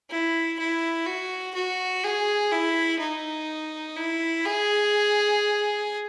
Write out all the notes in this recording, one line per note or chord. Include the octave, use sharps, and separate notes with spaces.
E4
E4
F#4
F#4
G#4
E4
D#4
E4
G#4